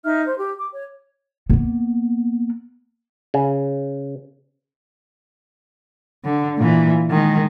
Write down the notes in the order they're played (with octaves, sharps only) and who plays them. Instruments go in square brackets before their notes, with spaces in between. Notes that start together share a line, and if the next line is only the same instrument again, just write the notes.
[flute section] D#4 E5 F6
C5
G4
D6
C#5
[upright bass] A#3 B3
[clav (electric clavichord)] C#3
[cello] D3
A#2 E3
D#3 G#3